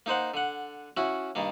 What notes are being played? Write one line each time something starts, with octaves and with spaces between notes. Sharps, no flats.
A#3 D#4 C5 F#5
D3 F#5
C#4 E4 F#4
G2 D#3 A#3